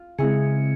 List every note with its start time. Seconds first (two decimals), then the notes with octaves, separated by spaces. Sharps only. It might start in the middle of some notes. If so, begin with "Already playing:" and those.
Already playing: F4
0.19 C#3 G#3 C4 E4 G#4